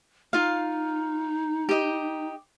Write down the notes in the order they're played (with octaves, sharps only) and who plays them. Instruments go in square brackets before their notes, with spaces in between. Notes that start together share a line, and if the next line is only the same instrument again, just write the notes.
[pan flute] D#4 [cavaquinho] F4 F5
[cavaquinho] G4 D#5